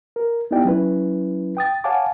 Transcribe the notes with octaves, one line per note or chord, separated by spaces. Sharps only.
A#4
B3 D#4 E4 G4 D5 G5
F#3 C#4 E4 B4
G5 D#6 A6
C#5 F5 F#5 G#5 A5 D6